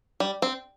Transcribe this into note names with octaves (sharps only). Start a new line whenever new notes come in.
G3
C4